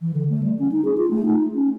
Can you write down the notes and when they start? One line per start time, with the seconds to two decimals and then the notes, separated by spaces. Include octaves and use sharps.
0.01 E3
0.14 D3
0.30 A3
0.43 G3
0.59 C#4
0.72 D#4
0.85 G#4
0.98 F4
1.11 A3
1.26 D#4
1.55 C#4